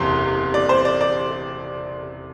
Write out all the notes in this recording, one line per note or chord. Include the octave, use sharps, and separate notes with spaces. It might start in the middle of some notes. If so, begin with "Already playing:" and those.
Already playing: F#1 E2 C3 C6
D5
C5
D5
D5